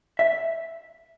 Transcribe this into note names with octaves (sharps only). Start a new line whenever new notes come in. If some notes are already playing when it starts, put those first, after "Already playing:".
E5